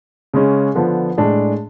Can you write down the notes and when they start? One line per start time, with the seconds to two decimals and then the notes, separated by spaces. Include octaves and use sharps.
0.34 C#3 G#3 C#4
0.75 D3 F3 B3 D4
1.18 A2 G#3 D4